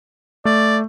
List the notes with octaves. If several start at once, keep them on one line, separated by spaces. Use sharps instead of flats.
A3 D5